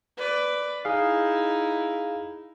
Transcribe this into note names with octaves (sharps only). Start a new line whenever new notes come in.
B4 D5
D#4 E4 G#4 F5